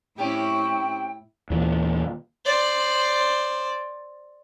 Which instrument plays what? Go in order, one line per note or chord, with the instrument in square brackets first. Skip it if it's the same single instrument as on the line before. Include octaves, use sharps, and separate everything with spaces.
[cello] A2 E4 [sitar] C4 C#4 G4 [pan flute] G5
[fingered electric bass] D#2 A#2 E3
[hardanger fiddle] C5 D5